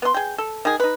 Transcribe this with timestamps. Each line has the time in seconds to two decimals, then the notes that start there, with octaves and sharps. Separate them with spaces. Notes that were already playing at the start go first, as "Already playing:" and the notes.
0.02 B3 C6
0.14 G#4 G5
0.38 A4
0.65 D#3 G#4
0.80 D#4 B4